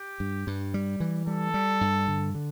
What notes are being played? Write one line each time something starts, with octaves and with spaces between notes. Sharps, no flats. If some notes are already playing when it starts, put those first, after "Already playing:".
Already playing: G4
G2
G2
G3
E3
G3 A4
G3
G2
D3
D3